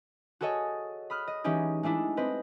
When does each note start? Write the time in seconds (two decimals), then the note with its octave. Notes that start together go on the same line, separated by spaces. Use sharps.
0.41 F#4 G#4 A4 C#5 D#5
1.10 B5 D#6 F6 F#6
1.27 D#5
1.44 E3 G#3 C#4 D#4 G4 G#4
1.83 G#3 A3 D4 E4
2.17 C4 B4 D#5